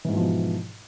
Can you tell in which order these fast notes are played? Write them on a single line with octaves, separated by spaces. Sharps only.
E3 G#2 B2 F3